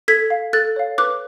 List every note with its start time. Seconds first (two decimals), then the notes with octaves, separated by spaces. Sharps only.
0.08 A4 G#6 B6
0.30 F5
0.53 A4 F#6 A6
0.76 C#5 F5
0.98 B4 D6 F#6